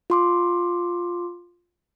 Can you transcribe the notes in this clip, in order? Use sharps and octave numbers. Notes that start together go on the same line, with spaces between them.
F4 C6 D6